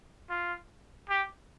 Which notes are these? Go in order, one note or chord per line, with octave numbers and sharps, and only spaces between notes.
F4
G4